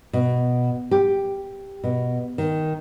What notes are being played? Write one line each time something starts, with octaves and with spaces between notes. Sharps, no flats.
B2
G4
B2
D#3